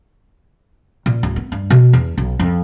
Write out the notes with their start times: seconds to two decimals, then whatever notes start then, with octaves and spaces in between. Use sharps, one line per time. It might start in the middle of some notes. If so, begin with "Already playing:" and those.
1.06 A#2
1.23 D1
1.36 B3
1.52 G2
1.70 B2
1.93 E2
2.18 B1
2.39 F2